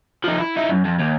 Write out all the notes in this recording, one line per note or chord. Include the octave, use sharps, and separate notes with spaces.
F3 D#4
E4
D#4 E4
F#2
F2
D#2